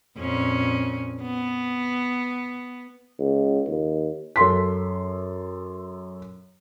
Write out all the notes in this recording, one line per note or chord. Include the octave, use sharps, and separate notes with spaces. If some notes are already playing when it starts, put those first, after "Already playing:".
F2 A#2 C#4
B3
C#2
D#2
F#2 A4 C6 B6